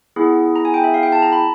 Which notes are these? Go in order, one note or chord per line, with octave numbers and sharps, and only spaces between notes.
B3 E4 G#4
A#5
G#5
G5
E5
F5
G5
A5
A#5
B5